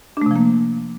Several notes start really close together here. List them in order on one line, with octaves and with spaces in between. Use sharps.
D4 A3 C3 F3 A#3